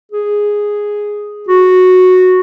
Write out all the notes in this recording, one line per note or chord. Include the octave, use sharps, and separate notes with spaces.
G#4
F#4